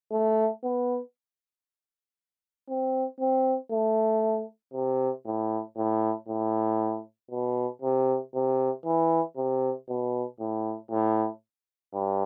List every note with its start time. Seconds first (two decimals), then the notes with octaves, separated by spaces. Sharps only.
0.12 A3
0.63 B3
2.69 C4
3.20 C4
3.71 A3
4.74 C3
5.25 A2
5.77 A2
6.28 A2
7.31 B2
7.82 C3
8.34 C3
8.85 E3
9.36 C3
9.88 B2
10.40 A2
10.91 A2
11.94 G2